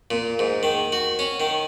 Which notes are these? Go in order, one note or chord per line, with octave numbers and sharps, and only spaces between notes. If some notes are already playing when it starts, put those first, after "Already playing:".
A#2
G#2
D#3
F#4
C#4
D#3